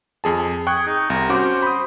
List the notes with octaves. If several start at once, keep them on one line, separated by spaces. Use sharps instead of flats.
F2 G#4 A5
G#4 G5 C#6 F#6
D#4
C2 A#5
C#4 F#4 C5 D6
B5 D#6